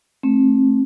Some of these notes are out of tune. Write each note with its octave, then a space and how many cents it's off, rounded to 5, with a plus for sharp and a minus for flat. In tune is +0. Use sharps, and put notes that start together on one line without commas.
A3 +0 C4 +40